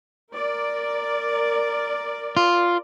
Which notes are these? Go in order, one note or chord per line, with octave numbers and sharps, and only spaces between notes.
A#4 D5
F4